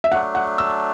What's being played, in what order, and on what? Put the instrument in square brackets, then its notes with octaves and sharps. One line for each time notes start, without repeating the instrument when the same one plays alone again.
[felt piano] E5
[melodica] F#3 A3 D4 [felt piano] F#5
[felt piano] F#5
E6